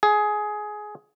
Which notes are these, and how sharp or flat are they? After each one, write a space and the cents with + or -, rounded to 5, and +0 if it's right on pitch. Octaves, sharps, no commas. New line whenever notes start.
G#4 +15